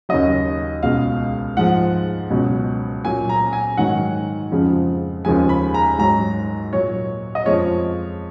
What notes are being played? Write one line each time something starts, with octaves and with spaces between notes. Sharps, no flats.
D#2 C#3 F#3 D#5
C#2 B2 G#3 F5
G#2 F3 G#3 F#5
C#2 B2 F#3
A#2 F#3 G#5
A#5
G#5
G#2 D#3 F#3 F#5
F2 C#3 F3 G#3
D#2 C#3 F3 G#3 G#5
B5
A#5
G#2 F#3 A#5
A#2 F#3 C#5
D#5
F2 F3 G#3 C#5